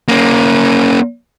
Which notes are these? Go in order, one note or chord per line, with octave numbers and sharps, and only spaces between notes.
A#3 C#4